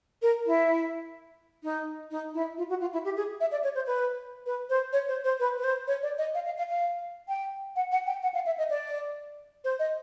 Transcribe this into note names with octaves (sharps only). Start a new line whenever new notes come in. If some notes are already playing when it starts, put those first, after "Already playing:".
A#4
E4
D#4
D#4
E4
F4
F#4
F4
E4
G4
G#4
E5
D5
C#5
C5
B4
B4
C5
C#5
C5
C5
B4
B4
C5
C#5
D5
D#5
F5
F5
F5
F5
G5
F#5
F#5
G5
F#5
F5
E5
D#5
D5
C5
D#5